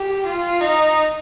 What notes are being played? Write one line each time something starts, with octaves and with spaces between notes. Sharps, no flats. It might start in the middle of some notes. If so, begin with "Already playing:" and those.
Already playing: G4
F4
D#4